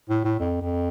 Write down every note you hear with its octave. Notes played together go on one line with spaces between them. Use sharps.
A2
A2
F2
F2